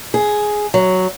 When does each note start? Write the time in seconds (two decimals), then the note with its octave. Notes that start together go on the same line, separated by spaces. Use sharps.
0.14 G#4
0.74 F#3